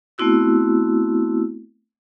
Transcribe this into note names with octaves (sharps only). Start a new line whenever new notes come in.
A3 B3 C4 E4 F#4 E6